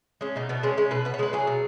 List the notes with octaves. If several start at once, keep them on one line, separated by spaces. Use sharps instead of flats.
G#3 C#4
B2 D#4
B2 B3
G#3 C#4
G#3 C#4
B2 B4
B2 B4
C#5
G#3 B4
F#3 G#4
B2